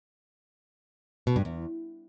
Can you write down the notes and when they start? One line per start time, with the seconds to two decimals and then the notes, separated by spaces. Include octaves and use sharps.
1.27 B2
1.36 G2
1.45 E2